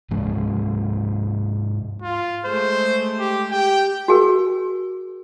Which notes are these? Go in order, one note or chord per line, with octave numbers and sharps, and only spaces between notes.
G#2 C3 F3 G#3
F4
G#3 A3 C5
G4
G4 G5
F#4 G#4 A#4